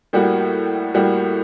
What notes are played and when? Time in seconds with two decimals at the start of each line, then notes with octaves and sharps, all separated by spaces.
0.13 A2 G3 A#3 F#4
0.94 A2 G3 A#3 F#4